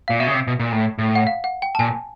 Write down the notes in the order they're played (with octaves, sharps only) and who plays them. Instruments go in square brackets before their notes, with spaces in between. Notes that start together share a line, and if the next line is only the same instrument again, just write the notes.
[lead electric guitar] A#2 [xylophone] F5
[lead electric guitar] B2 [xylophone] E5
[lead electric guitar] C#3
C3
B2
A#2
A2
A2
[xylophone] F#5
F5
F#5
G5
A5
[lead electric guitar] A#2 [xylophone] G#5